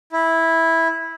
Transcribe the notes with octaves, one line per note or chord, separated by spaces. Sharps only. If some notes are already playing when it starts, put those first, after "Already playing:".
E4